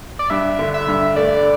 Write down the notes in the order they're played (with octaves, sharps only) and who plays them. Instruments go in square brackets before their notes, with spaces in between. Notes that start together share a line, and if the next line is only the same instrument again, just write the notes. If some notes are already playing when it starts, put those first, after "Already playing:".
[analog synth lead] D5
[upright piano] G2 [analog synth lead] E5
[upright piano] D3
[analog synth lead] E5
[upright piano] G2
[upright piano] A3 [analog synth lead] D5